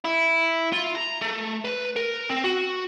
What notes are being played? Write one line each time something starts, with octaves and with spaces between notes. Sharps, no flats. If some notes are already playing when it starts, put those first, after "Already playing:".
E4
F4
A#5
A3
B4
A#4
C4
F#4